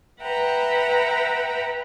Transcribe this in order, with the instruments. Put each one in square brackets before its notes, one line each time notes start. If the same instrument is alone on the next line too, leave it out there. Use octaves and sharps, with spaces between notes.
[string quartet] B4 E5 F#5 G5 A#5